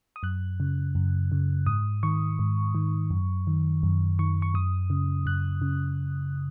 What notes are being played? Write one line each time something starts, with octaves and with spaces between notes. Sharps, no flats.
D#6
F#2 F#6
C#3
F#2
C#3
G#2 D#6
D#3 C#6
G#2
D#3
F#2
D#3
F#2
D#3 C#6
C#6
F#2 D#6
C#3
F#2 F#6
C#3